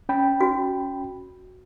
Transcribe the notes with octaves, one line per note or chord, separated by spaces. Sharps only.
C#4 G5 B5
F#4